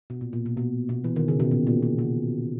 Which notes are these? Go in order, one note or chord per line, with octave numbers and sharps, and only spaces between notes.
B2
A#2
A#2
B2
B2
B2
E3
D#3
C#3
B2
A#2
A#2
B2
B2